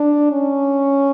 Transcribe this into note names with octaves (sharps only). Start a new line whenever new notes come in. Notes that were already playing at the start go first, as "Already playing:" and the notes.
Already playing: D4
C#4